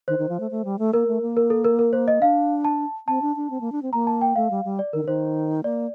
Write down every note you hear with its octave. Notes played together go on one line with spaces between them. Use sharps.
D#3 C5
D#3
F3
A3
A3
G3
A3
A#3 A#4
A3
A#3
A#4
A4
A#4
A#4
C5
D#5
D4 F5
A5
C4 A5
D4
D4
C4
A#3
D4
C4
A#3 A#5
A5
G5
A3 F5
G3
G3
D5
D#3 A#4
D3
D#3 C5
A#3 D5